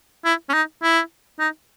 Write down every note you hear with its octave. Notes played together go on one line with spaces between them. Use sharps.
E4
C#4
D#4
E4
D#4